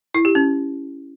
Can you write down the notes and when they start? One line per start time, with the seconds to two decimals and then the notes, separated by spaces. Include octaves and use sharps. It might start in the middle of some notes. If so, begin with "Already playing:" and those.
0.15 E4
0.25 G4
0.35 C#4